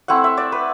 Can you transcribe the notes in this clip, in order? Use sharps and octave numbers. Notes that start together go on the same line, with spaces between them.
A3 C4 E4 F#5
E5
D5
B4